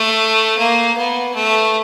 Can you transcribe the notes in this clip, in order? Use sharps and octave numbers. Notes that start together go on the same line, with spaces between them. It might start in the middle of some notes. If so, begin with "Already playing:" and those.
Already playing: A3
A#3
B3
A3